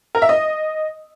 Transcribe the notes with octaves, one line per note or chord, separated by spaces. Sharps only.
A#4
E5
D#5